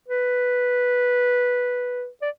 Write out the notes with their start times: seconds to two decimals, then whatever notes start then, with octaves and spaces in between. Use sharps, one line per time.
0.08 B4
2.22 D5